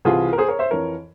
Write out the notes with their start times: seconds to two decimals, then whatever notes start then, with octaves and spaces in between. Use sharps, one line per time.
0.05 C2 C3 E3 F4 G#4
0.33 A#4
0.38 G#4 C5
0.48 A#4 C#5
0.59 C5 E5
0.71 F2 E3 A#4 C#5